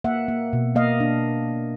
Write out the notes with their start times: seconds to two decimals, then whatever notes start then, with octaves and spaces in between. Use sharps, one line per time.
0.04 A#3 E5 F#5
0.28 A#3
0.53 B2
0.75 A#3 D#5 F5
1.00 D4